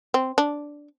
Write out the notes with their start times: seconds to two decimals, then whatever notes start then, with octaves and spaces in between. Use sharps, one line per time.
0.14 C4
0.38 D4